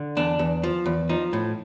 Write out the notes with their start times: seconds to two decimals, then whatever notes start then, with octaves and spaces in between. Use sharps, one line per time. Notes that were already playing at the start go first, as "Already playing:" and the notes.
Already playing: D3
0.17 E2 D4
0.39 E2
0.63 F3
0.86 E2
1.09 F3 D#4
1.33 A2